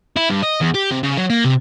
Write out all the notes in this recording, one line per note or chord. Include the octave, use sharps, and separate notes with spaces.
E4
G2
D#5
E2
G4
C3
C#3
F#3
A#3
C3